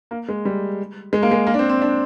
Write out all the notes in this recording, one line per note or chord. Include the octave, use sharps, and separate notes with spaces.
A#3
G#3
G3
G#3
A#3
G#3
A#3
D4
C4
C4
D4